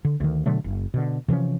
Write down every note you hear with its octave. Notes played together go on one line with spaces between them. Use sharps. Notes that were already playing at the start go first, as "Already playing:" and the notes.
D3
D2 D#3
B2 D3 F#3 A3
F#1
B2 D3
C3 E3 F3 C#4